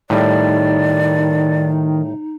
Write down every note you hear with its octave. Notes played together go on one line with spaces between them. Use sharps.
A2 D#3 G3 D#4 D5